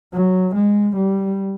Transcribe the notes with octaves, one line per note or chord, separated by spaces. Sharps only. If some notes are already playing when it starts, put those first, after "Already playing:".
F#3
G#3
G3